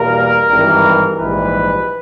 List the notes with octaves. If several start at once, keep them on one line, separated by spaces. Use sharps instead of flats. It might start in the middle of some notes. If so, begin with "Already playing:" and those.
Already playing: E2 B2 G3 A#3 A#4
G#1 G2 E3 G3
A#1 G#2 E3 G3 B4